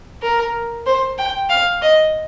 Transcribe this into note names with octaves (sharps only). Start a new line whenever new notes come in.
A#4
C5
G5
F5
D#5